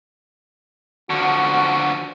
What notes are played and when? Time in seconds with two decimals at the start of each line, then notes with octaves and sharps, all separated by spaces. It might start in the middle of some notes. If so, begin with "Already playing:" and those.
1.10 D3 F3 F#4